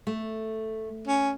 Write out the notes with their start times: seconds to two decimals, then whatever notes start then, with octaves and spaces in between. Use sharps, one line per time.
0.07 A3
1.08 C#4